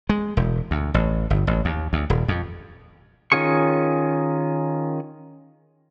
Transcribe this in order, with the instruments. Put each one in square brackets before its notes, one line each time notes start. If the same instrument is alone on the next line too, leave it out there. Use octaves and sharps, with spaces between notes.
[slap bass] G#3
E1
D2
A1
G1
A1
D#2
D2
D#1
F2
[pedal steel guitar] D#3 C#4 F4 G#4 C#6